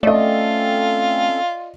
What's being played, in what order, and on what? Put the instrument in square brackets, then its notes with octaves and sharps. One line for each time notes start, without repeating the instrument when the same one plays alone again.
[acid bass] A3 [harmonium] C4 C#4 A4 [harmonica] F4 [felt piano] D5 D#5